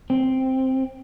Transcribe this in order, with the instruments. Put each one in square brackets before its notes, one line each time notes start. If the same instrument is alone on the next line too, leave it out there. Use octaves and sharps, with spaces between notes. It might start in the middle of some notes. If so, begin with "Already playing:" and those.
[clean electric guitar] C4